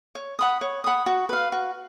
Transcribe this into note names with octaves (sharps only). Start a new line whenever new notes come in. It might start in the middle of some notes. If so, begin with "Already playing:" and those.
C#5
F#5 B5 D#6
C#5
F#5 B5 D#6
F#4
B4 F5
F#4